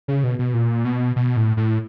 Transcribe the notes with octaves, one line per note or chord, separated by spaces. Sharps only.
C#3
B2
B2
A#2
B2
B2
A2
A2